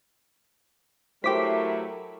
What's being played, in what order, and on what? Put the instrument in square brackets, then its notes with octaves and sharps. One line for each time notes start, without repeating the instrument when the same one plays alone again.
[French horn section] F#3 A3 E4 [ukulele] G4 C5 [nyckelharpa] A#4 [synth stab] D6 B6